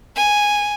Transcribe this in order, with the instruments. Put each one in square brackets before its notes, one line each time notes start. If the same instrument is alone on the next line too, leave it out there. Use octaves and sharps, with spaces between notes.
[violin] G#5